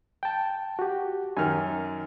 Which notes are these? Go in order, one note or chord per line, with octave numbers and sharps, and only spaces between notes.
G5 A5
F#4 G4
F#2 D#3 G#5 F6